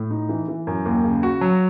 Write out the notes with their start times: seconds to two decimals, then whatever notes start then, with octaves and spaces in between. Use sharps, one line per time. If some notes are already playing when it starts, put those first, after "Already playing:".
Already playing: A2
0.11 D#4
0.29 E3
0.48 E3
0.67 F#2
0.85 D#2
1.04 C#3
1.23 F#4
1.41 F#3